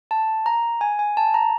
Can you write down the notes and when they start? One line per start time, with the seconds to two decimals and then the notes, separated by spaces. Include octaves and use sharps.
0.11 A5
0.46 A#5
0.81 G#5
0.99 G#5
1.17 A5
1.34 A#5